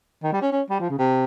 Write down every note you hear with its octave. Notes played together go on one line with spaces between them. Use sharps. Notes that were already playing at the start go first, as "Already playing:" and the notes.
D#3
G3
C#4
C#4
G3
F3
C#3
C3